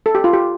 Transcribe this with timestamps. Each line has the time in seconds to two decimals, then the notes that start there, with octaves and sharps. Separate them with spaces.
0.06 A4
0.15 G4
0.24 F4
0.33 G4